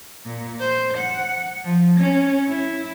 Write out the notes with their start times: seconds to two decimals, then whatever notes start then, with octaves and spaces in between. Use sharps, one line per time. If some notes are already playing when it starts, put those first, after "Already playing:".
0.26 A#2
0.60 C5
0.97 F#5
1.64 F3
1.99 C#4
2.48 E4